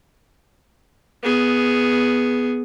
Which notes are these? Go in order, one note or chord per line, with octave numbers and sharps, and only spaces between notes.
B3 G#4